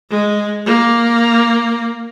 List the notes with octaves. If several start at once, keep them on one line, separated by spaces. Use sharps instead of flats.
G#3
A#3